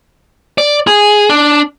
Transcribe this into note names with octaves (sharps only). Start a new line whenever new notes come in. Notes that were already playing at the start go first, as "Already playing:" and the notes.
D5
G#4
D4